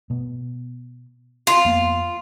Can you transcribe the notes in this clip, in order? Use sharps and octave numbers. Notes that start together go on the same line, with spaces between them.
B2 B3
F4
F2 A#3 B3